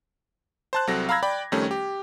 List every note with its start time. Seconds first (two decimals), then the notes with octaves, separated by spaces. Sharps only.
0.73 C5 A5 F#6
0.87 C2 F#3 C4 A4 A#6
1.09 F5 A#5 B5 E6 G#6 A#6
1.23 D5 G5 B5 D6
1.52 F2 D#3 G3 A3 C#4
1.71 G4